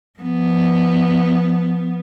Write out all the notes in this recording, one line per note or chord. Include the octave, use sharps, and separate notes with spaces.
F3 B3